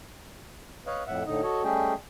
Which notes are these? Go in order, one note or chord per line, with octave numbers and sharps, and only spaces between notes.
B4 C#5 D#5 F5
F2 A2 E5 F#5
A2 D3 D#4 D#5
F#4 A4 C#5 D#5
G3 A3 C#4 G#4 D#5 G5